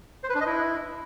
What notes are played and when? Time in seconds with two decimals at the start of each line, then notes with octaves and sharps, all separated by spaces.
0.24 C5
0.29 B4
0.35 D4
0.41 D#5
0.46 E4